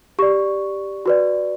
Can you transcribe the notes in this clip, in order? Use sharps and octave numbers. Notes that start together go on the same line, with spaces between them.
G4 D5 C#6
F#4 B4 D5